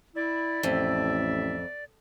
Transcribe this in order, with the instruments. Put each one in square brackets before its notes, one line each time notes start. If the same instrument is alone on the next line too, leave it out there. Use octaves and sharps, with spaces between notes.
[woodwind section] E4 [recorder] D5
[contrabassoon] A1 [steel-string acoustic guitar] F2 [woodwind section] A2 E5